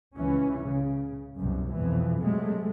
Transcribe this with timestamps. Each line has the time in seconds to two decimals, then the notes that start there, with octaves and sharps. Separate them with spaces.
0.16 C#2 E3 C#4
0.66 C#3
1.38 C2 F#2 B2
1.73 F2 B2 E3
2.21 C3 F#3 G#3 A3